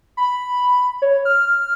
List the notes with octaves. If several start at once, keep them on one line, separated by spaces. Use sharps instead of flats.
B5
C#5
F6